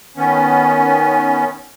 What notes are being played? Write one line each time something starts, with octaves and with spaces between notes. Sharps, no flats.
D#3 B3 C#4